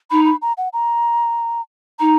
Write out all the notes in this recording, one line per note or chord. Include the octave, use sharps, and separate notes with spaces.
D#4 B5
B5
A#5
F#5
A#5
D#4 A#5